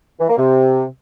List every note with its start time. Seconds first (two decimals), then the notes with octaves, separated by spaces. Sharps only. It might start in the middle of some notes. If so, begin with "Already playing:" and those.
0.20 E3
0.29 A#3
0.38 C3